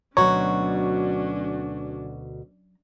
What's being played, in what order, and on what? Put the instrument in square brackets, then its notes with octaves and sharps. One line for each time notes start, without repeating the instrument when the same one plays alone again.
[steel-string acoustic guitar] D2 B2 F#4 [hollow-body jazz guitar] F#3 A#5 [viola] C#4 D4 [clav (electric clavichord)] C#5